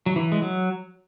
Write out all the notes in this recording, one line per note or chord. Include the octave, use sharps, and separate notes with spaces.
F#3
E3
G#3
F#3